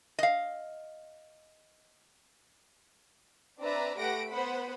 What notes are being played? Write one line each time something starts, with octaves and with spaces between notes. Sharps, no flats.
D#5 F5
C4 D4 B4 D5 E5 A#5
A3 G4 B4 F#5 A#6 D7
B3 B4 C5 F#5 B5